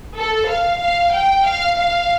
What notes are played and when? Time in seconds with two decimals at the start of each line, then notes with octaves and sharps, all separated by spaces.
0.16 A4
0.49 F5
0.81 F5
1.13 G5
1.46 F5
1.79 F5